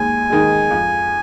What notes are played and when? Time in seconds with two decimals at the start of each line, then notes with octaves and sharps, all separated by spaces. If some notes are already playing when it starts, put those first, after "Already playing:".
Already playing: D#2 G#3 G#5
0.30 D#3 G#3
0.70 F2